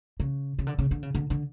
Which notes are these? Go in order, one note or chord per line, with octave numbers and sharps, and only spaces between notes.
C#3
C#3
D3
C#3
D3
C#3
D3
D3